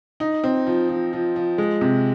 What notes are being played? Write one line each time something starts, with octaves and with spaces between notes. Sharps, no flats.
D#4
C4
F3
F3
F3
F3
G#3
C3